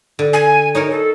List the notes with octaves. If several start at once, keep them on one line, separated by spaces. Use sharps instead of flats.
D3
G#5
D#4 F#4 A#4 C#5
A4